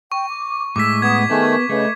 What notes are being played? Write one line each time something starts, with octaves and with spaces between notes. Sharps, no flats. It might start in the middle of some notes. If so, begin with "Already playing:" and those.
G5 C#6
D6
A2 G#3 D6 E6 B6
B3 D#6 G#6
D#3 A3 B3 G#4 A#4 G#5
C#3 A3 B4 D#5